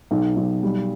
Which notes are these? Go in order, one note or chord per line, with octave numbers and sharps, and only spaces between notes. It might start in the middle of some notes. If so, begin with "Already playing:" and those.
B1
B1
G3